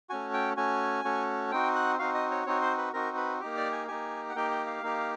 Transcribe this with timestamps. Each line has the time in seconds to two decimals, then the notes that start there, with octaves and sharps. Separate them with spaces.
0.10 A3 C#4 F#4 G#5
0.33 G5
0.57 A3 C#4 F#4 G#5
1.05 A3 C#4 F#4
1.52 C4 D#4 F#4 G5
1.75 F#5
1.99 C4 D#4 F#4 F5
2.14 D#5
2.31 C#5
2.46 C4 D#4 F#4 C#5
2.62 C5
2.78 B4
2.93 C4 D#4 F#4 A#4
3.17 B4
3.40 A#3 D#4 G4
3.57 D5
3.72 G#5
3.88 A#3 D#4 G4 G#5
4.29 F#5
4.35 A#3 D#4 G4 G5
4.51 G5
4.67 F5
4.83 A#3 D#4 G4